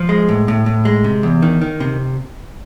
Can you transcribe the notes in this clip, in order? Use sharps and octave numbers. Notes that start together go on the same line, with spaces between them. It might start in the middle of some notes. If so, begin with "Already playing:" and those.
Already playing: F3
G#3
A2
A2
A2
G#3
C3
E2
D#3
D#3
C3